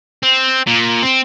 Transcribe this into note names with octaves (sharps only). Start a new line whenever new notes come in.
C4
A#2
C4